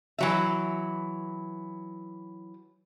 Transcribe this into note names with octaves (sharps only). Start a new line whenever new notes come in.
E3 F#3 E5